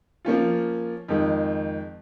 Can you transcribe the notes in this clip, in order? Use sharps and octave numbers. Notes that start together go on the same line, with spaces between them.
F3 A#3 C#4 F4
F2 D#3 G#3